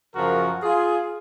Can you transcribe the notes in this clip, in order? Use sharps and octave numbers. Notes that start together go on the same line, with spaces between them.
F#2 C#3 F3 F#4 A#4
F4 G#4